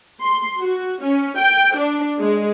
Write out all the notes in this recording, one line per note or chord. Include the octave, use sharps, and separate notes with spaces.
C6
F#4
C#4
G5
D4
G#3